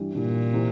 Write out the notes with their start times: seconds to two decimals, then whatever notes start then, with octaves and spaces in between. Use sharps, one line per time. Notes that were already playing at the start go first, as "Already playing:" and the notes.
Already playing: G2 E3 G3
0.14 G2 A#2 E3 G3
0.53 C3 E3